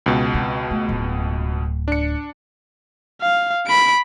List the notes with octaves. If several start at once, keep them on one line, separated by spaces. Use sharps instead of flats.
C#2 B2
C4
A3
D1
D4 C#7
F5
B5 D7